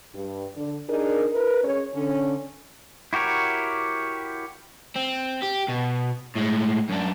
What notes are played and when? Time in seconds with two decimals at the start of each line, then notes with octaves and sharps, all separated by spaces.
0.13 G2
0.56 D3
0.89 D4 D#4 G#4 A#4
1.32 E4 A#4 B4
1.63 G#3 C#4 C#5
1.94 D3 C#4
3.13 E4 F#4 G4 A#4 C#5
4.96 C4
5.42 G4
5.68 B2
6.35 A2 G#3
6.89 F#2 D4